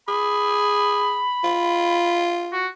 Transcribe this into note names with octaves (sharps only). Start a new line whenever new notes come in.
G#4 B5
F4
F#4